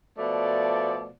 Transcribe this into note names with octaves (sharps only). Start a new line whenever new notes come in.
B2 F3 A3 D5